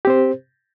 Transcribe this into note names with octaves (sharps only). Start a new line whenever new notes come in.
C4 G4 C5